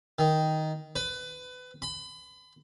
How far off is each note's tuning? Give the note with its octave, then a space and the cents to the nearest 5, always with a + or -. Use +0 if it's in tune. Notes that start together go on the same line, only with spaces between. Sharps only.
D#3 +5
B4 +25
B5 +35